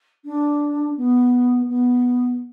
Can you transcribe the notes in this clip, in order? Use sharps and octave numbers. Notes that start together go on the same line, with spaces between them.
D4
B3
B3